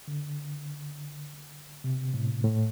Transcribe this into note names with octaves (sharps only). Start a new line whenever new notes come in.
D3
C3
A2
A2